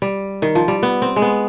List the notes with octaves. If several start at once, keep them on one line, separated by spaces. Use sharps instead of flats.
G3
D#3
F3
G3
B3
C4
G#3
B3